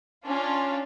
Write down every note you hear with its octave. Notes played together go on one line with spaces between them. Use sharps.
C#4 D4 F4